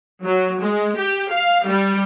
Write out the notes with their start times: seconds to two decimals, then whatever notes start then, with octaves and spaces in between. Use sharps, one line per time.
0.23 F#3
0.60 G#3
0.96 G4
1.30 F5
1.65 G3